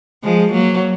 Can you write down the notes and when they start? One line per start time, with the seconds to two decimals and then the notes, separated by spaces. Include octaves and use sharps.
0.24 F3 G#3
0.52 F#3 A#3